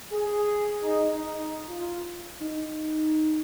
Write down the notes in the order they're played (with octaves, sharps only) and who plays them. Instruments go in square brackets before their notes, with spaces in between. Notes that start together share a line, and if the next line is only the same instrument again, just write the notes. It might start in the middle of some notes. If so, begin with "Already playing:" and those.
[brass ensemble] G#4
D#4
D#4
F4
[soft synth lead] D#4